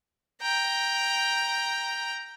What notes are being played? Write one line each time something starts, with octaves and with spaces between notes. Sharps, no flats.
G5 A#5